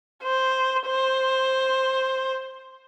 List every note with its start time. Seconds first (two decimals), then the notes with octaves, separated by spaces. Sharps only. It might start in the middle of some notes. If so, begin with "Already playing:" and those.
0.24 C5
0.87 C5